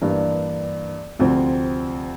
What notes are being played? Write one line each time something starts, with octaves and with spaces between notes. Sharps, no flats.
G2 E3 A#3 D4
D2 C3 F3 C4